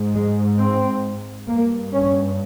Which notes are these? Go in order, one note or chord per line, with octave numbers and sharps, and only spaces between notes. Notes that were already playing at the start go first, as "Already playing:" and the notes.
Already playing: G#2
G#3
C4
G2 A#3
C#4